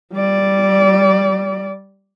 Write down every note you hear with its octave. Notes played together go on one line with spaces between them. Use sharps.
G3 D5